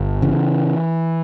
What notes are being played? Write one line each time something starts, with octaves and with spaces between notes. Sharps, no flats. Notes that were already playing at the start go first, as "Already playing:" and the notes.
Already playing: G1
C#3 E3